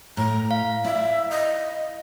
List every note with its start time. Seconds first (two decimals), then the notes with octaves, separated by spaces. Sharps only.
0.17 A2 A#5
0.51 F5
0.84 E4 D5 E5
1.31 D#5